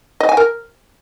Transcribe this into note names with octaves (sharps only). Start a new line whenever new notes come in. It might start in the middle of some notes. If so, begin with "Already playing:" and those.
D#5
G#5
A#4